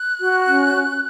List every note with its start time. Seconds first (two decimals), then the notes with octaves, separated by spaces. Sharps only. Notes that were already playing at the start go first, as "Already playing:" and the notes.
Already playing: F#6
0.18 F#4
0.46 C#4
0.74 C#4